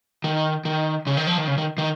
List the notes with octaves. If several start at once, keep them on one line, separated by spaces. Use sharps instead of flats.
D#3
D#3
C#3
D#3
F3
D#3
C#3
D#3
D#3